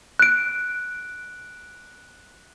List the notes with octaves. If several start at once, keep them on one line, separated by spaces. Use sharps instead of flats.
F#6 D7